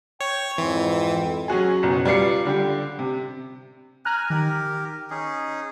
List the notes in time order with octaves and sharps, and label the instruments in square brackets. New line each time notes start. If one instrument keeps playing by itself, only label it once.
[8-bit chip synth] C#5 [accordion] G5
[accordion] F2 G#2 C4 [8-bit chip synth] E3
[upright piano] F#3 C#4 F#4 G#4
F#1 B2
G3 F4 D5 C7 C#7
D3 G3 G4
C3
[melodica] G#5 [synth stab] A#5 F6 F#6
[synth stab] D#3 [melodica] G4 A#4
[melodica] C#4 D#4 G#4